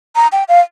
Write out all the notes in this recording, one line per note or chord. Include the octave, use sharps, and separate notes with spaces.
A#5
G5
F5